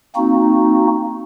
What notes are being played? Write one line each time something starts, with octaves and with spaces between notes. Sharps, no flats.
A#3 C4 D#4 F#4